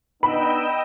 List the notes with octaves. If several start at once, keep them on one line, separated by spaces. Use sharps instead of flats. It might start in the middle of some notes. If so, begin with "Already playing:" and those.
B3 D4 D#4 D#5 G5 B5 E6